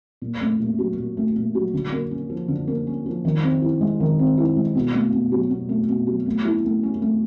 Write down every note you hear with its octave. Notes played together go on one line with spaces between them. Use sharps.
A#2
A3
A#2
F#3
A#2
A3
A#2
F#3
D3
A#3
C#4
F3
D3
A#3
C#4
F3
D#3
C4
E4
G#3
D#3
C4
E4
G#3
B2
A3
B2
F#3
B2
A3
B2
F#3
A3
E4
A3
C#4
A3